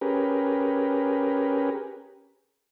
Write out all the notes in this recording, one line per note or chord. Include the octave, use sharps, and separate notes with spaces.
C#4 G4 G#4 A#4 B4